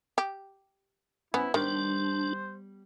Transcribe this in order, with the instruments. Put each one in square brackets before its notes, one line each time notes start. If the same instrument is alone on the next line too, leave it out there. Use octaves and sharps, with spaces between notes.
[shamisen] G4
[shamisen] B3 [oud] C#4 [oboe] E4
[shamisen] D#3 [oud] G3 B3 [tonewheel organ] D4 [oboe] C5